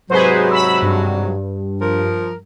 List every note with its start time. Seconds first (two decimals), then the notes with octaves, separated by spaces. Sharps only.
0.10 G#2 C3 F#3 G#4 B4 C5
0.51 B5 E6
0.82 G2
1.81 F3 A#4